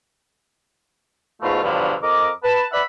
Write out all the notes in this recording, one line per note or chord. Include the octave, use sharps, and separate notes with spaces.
E2 G#2 B2 A3 F4
E2 G2 B2 D3 F3 F#3
F2 A#4 D#5 D6
B4 A5
B4 D5 E5 F#5 B5